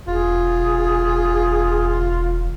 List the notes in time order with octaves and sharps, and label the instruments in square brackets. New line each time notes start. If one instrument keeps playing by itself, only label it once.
[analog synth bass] E1 [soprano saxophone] F4 [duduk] G#4